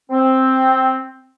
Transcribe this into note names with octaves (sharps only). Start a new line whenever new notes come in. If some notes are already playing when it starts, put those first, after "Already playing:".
C4